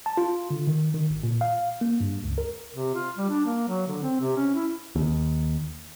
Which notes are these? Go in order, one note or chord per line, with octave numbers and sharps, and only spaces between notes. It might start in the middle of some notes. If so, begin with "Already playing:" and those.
A5
F4
D3
D#3
D#3
G#1
A#2
F5
A#3
G2
C#2
A#4
C3
F4
G3
D4
A#3
F#3
D3
C4
C3
C#4
E4
D#2